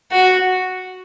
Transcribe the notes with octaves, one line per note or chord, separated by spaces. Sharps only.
F#4